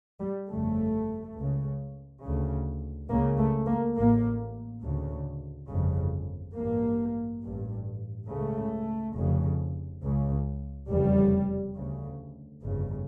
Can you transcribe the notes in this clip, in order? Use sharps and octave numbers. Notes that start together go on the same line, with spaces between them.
G3
G1 F2 C#3 A3
C#2 C#3
D2 C#3
C#2 C#3 A#3
A3
A#3
A1 A2 A#3
D2 C#3
G1 F2 C#3
A1 G2 A#3
A1 G2
C#2 C#3 A3
F1 F2 C#3
C#2 C#3
F1 E2 C#3 G3
D2 C#3
G1 F2 C#3